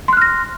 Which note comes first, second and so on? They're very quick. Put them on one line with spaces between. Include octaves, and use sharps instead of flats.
C6 F#6 F6 A#6